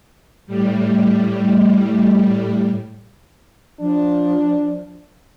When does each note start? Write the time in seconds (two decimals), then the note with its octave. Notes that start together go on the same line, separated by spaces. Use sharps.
0.47 A2 G3
3.80 F3 D4